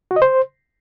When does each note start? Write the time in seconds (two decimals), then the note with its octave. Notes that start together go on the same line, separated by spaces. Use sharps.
0.11 F#4
0.16 D#5
0.22 C5